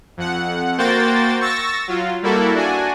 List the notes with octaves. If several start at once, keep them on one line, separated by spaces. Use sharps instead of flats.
F2 F#5
A#3 F#4 C5 G5 A6
C#6 E6 A6 A#6
F#3 F4
G3 A#3 E4 F#4 A4
D4 F#4 G#5